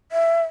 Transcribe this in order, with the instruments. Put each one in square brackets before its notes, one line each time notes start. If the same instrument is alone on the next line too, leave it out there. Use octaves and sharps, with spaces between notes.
[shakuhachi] E5